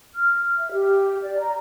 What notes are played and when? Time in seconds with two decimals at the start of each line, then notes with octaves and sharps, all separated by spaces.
0.15 F6
0.56 E5
0.73 G4
1.22 D5
1.39 A#5